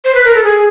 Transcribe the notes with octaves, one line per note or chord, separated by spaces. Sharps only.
C5
B4
A#4
A4
G#4